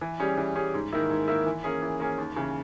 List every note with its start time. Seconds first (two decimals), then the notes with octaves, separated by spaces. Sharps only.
0.01 E3
0.20 G3 C#4 G#4
0.38 E3
0.56 G3 C#4 G#4
0.74 G#2
0.93 D#3 A#3 E4
1.10 G#2
1.28 D#3 A#3 E4
1.46 E3
1.64 A#3 C#4 G#4
1.82 E3
2.00 A#3 C#4 G#4
2.18 D#2
2.36 C#3 E3